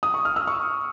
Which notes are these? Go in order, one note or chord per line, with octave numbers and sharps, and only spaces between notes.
D#6
C#6
F6
E6
C#6